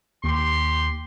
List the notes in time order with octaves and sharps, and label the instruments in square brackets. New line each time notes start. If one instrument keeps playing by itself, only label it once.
[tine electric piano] D#2 [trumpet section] G4 C6